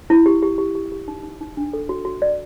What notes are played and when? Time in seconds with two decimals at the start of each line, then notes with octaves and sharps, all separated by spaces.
0.10 E4
0.26 G4
0.43 G4
0.58 G4
0.75 G4
0.92 G4
1.08 D#4
1.23 D#4
1.41 D#4
1.57 D4
1.73 A4
1.89 F#4
2.05 F#4
2.22 D5